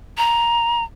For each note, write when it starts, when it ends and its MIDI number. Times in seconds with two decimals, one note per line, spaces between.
0.18 0.84 82